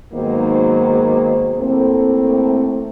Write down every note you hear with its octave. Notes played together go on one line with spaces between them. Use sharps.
G#2 D#3 F#3 A#3 B3 C5
A2 A3 A#3 C4